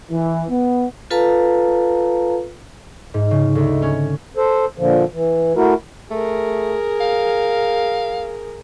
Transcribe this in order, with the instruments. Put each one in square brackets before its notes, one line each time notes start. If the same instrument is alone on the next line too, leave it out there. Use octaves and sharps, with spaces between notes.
[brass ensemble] E3
B3
[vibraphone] F4 A4 B4 F5 A5 A#5
[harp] G#2
C#3
D2
C#4
[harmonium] A4 C5
A#2 D3 F3
E3
A3 E4 F#4 A#4
[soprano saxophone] A3 [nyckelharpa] G#4 A#4
[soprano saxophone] F5